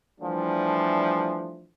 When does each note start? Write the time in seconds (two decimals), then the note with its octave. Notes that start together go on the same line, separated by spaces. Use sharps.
0.20 E3 F3 G3 A3 D4